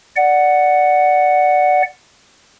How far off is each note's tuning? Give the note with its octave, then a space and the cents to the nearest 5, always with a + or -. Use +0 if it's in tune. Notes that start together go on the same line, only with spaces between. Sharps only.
D5 +0 F#5 +0